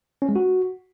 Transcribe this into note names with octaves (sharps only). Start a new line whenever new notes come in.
C#4
G#3
F#4